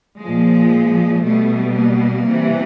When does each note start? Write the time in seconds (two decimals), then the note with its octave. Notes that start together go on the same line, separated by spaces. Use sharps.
0.20 A#2 F3 G#3
1.23 B2 G3 A3
1.75 A#3
2.27 C3 E3 G3